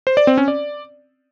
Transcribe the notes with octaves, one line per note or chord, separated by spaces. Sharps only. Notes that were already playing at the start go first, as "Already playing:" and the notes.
C5
D5
C4
C#4
D5